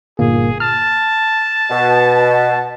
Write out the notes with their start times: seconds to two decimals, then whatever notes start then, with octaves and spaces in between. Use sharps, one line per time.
0.19 G1 A#2 A#3 G#4
0.60 A5 F6
1.70 B2